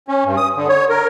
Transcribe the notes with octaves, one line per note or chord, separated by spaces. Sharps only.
C#4
G2
D#6
D3
C#5
A#4